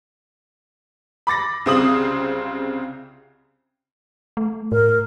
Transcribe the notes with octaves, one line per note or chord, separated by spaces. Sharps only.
B5 D6 A6 A#6
C2 C#3 C4 F4 D#6 F#7
A3
A2 A#4